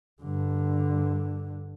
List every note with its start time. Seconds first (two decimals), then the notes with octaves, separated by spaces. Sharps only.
0.23 G2 D3